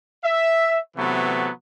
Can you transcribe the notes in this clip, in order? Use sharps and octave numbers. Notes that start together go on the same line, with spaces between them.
E5
C3 E3 F#3 A3 B3